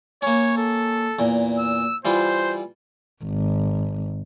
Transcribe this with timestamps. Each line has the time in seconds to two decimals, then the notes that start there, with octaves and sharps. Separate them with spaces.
0.22 A#3 C#4 C#5
0.57 A4
1.19 E2 A#2
1.58 E6
2.05 E3 G3 F4 C5
3.24 G#1